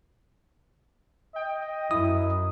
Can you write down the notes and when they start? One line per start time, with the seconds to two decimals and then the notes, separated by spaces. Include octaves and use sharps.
1.36 D#5 G5
1.91 F#2 E4 D#6